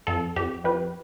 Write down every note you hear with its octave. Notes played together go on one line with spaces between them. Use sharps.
F2 A4
F2 G4
F2 G4 B4